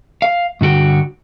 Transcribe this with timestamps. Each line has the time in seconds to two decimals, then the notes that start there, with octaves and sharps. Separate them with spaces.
0.22 F5
0.61 G2 D3 F#4 G5